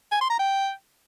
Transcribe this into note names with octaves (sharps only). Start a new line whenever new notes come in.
G#5
C6
A#5
G5